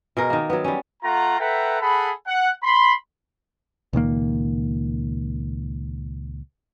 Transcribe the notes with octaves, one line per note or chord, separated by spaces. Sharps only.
B2 G#3 A#4
D#3 A#3
F#3 B3
G3 C#4
A3 F4 F#5 A#5
A4 B4 E5 F#5 G5 A#5
G#4 A4 F#5 B5
F#5
B5 C6
C#2 A#2 D#3 A#3